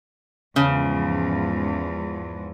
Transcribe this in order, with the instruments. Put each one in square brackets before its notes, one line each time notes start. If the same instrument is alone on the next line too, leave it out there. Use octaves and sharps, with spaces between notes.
[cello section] E2 G#2 F3 [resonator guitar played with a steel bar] C#3 [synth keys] C#4